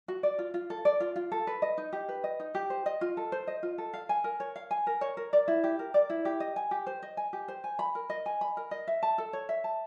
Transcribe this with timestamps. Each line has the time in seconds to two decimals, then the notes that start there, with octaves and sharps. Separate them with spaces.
0.08 F#4
0.23 D5
0.39 F4
0.54 F4
0.70 A4
0.85 D5
1.00 F4
1.16 F4
1.32 A4
1.47 B4
1.62 D#5
1.78 D#4
1.93 G4
2.09 B4
2.24 D#5
2.40 D#4
2.55 G4
2.70 C5
2.86 D#5
3.01 F4
3.17 A4
3.32 C5
3.47 D#5
3.63 F4
3.78 A4
3.93 F5
4.09 G#5
4.24 A#4
4.40 C#5
4.56 F5
4.71 G#5
4.87 A#4
5.01 C#5
5.17 A#4
5.33 D5
5.48 E4
5.64 G4
5.79 A#4
5.94 D5
6.10 E4
6.25 G4
6.40 D#5
6.56 G#5
6.71 G4
6.87 C5
7.02 D#5
7.17 G#5
7.33 G4
7.48 C5
7.64 G#5
7.79 B5
7.95 A#4
8.10 D#5
8.26 G#5
8.41 B5
8.57 A#4
8.71 D#5
8.88 E5
9.03 A5
9.18 A4
9.33 C#5
9.49 E5
9.64 A5